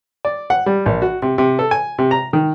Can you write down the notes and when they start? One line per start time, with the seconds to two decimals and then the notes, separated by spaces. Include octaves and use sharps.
0.25 D5
0.50 F#5
0.66 G3
0.86 A#1
1.02 F#4
1.22 C3
1.38 C3
1.59 A4
1.71 G#5
1.99 C3
2.11 A#5
2.33 D#3